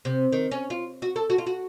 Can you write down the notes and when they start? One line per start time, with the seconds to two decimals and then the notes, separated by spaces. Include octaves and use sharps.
0.05 C3
0.32 D#3
0.51 C#4
0.70 F4
1.02 F#4
1.16 A4
1.30 F#4
1.38 F4
1.46 F#4